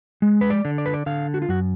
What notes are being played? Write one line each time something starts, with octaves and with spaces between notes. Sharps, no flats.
G#3
B4
D5
D3
D5
B4
D5
D3 F5
F#4
F4
F#2 F#4